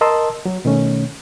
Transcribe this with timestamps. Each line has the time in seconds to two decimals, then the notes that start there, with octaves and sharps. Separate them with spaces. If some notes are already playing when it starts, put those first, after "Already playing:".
0.01 A#4 D#5 A5 C6 E6
0.46 F#3
0.65 B2 D#3 A3 C#4